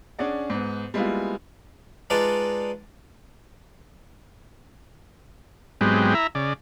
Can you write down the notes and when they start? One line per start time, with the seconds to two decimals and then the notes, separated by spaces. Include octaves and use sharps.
0.19 C#4 D4 G#4 D5 F#5
0.50 G#2 B3
0.94 G3 G#3 A#3 B3 E4 F4
2.10 G#3 D4 D#4 F4 B4 D5
5.81 G#2 F#3 G#3 B3 C4 G4
6.15 E4 E5 A#5
6.35 C#3 D5